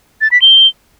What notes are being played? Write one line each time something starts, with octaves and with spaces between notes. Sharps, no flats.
A6
B6
G7